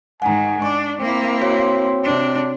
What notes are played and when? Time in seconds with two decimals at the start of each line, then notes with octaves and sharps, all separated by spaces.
0.22 G#2 D#3 F#5 G#5 A#5
0.62 D4 C#6 D6
1.01 A#3 C4 E4
1.42 F#4 C#5 C6
2.04 C3 D4